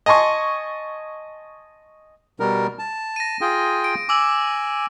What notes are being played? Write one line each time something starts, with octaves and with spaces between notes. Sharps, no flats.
D#5 G#5 A5 C6 C#6
B2 G3 A#4
A5
A#6 D#7
F4 G#4 G5
D7
G#5 D6 E6 F#7